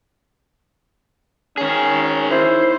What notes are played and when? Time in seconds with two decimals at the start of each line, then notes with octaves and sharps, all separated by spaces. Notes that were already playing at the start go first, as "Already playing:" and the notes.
1.57 D#3 C#4 G#4
2.31 D#4 E4 C5